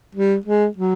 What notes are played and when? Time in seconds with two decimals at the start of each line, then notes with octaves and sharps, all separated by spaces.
0.15 G3
0.46 G#3
0.77 F#3